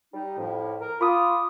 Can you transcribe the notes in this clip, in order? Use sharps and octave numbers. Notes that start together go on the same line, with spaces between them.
G3 D#4
F2 A2
A#4
F4 B5 D6 D#6